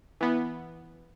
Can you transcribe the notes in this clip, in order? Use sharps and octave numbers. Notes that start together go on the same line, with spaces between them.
E3 B3